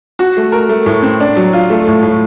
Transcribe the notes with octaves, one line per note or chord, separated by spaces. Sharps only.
F#4
A3
A#4
A3
A2
C4
D4
F#3
F4
A3
A2
A2